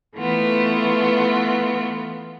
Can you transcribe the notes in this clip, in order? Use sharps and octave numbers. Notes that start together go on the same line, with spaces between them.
E3 A3 B3 F4